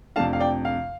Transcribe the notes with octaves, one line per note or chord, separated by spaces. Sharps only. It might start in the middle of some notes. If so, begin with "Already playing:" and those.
F2 C3 A3 D4 F5 A5
F5
D5 G5
F5